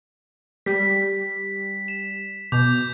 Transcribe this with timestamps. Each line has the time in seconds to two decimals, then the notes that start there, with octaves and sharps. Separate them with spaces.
0.66 G3 B6
1.88 E7
2.52 B2 D6 G6